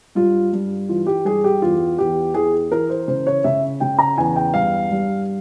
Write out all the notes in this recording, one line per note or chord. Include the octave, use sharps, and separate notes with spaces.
G2 F4
G2
E3 F4
G4
G2 G#4
G4
E2 F4
E2 G4
E3 G#4
E3 A#4
C5
C#3 C5
C#5
C#3 E5
C#3 G5
A#5
E2 G#5
G5
G2 F5
G2